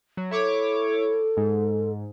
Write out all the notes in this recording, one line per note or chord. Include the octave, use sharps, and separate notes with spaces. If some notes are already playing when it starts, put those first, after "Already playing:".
F#3
E4 A4 C#5 D6
G#2